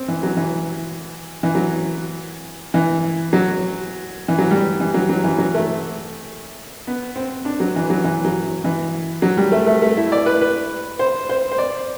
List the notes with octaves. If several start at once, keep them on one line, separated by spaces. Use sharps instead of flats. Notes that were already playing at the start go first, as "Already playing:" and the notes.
Already playing: C4
E3
F#3
E3
E3
F#3
E3
F#3
E3
F#3
G3
E3
F#3
F#3
E3
F#3
A3
B3
C4
D4
F#3
E3
F#3
E3
F#3
E3
F#3
G3
A3
A3
A3
E4
D5
B4
B4
C5
C5
C5
D5